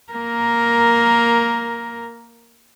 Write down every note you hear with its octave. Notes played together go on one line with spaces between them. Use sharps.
A#3 A#4